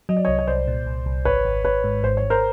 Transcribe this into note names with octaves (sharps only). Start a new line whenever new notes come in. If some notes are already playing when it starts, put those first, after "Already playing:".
F#3 D#5
D5
C2 C#5 D#5
C#5
C2 C5 D5
A#2
C2
C2
G#1 B4 C#5
G#1
G#1 B4 C#5
G#2
G#1 C5
C#5
G#1
A#4 C5